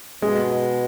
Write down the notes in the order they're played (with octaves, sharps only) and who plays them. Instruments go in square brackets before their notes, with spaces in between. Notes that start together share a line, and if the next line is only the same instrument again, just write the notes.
[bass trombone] B2 [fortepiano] G#3